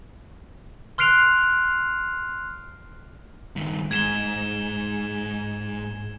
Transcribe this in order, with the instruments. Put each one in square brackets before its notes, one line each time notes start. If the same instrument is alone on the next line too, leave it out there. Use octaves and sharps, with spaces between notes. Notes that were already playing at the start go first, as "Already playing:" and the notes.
[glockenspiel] C6 F6 F#6 C7 D7 F7
[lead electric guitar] G2 D#3
[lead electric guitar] G#2 [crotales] G#6 E7 G7